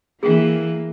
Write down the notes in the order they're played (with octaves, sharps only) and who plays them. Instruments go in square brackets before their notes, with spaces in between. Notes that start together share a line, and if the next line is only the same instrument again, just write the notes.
[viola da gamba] E3 [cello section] A#3 [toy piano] G#4 G5